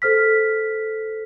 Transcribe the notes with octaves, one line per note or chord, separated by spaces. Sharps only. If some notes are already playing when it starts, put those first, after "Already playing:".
A4 C5 F6 B6